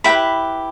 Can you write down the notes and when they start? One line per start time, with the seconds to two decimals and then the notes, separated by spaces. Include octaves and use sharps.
0.04 E4 G4 B4 G5 B5